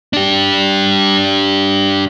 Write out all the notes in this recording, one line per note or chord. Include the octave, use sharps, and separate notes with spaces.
D4 G4